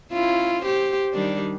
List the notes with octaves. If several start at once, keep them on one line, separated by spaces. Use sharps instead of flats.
C#4 E4 F4
G4 C5
D#3 G3 D4